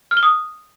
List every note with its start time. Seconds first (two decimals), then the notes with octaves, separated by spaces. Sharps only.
0.11 F6
0.17 G7
0.23 D#6